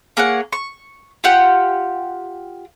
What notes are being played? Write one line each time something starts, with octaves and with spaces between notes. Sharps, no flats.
A#3 G#4 C#5 F#5
C#6
F4 G4 F#5